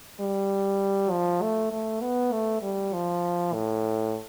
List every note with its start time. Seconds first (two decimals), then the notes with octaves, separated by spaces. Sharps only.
0.20 G3
1.11 F3
1.42 A3
1.72 A3
2.01 B3
2.32 A3
2.62 G3
2.93 F3
3.53 A2